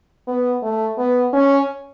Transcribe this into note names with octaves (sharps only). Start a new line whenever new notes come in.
B3
A3
B3
C#4